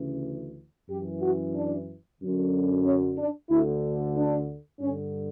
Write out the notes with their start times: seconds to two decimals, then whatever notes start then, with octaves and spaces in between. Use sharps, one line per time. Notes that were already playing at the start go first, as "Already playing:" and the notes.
Already playing: D2 C#3 E3
0.89 F#2 E3 G4
1.22 F#4
1.55 D4
2.20 F#2 D3
2.85 C#4
3.18 D4
3.50 D2 D3 E4
4.16 D4
4.80 G2 D3 C#4